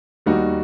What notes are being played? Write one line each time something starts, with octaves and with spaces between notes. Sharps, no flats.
D#2 D#3 G3 D#4 F#4